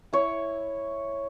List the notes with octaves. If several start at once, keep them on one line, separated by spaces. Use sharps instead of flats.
E4 C#5